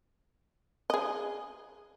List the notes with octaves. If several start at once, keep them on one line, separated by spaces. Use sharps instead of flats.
G#4 D#5